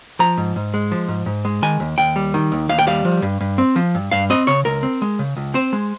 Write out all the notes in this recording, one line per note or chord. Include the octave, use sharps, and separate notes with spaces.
F3 A#5
G#2
G#2
G#3
F3
G#2
G#2
G#3
D#3 G#5
D#2
D#2 G5
G3
D#3
D#2
D#2 F5
G5
G3 F5
F3
G2
G2
C4
F3
G2
G2 F5
C4 D#5
C#3 C#5
C#2 A#4
C4
G#3
C#3
C#2
C4 C5
G#3